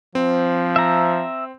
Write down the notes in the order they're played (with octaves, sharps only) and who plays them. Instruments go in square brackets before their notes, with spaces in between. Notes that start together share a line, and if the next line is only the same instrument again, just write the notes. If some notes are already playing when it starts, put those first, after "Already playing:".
[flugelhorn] F3 [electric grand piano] C4
[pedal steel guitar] E5 A#5